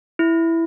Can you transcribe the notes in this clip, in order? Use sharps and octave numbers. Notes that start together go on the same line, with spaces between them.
E4